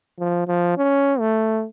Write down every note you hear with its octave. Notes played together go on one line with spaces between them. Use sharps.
F3
F3
C#4
A3